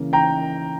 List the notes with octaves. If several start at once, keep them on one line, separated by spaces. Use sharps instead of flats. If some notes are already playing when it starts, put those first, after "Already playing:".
Already playing: C#3 E3 A#3
G5 A#5